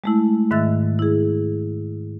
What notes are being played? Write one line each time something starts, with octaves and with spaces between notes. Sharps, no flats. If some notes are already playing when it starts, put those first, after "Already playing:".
G#3 A3 E4
G#2 D#3 E5 E6 F#6 A6
E4 G#4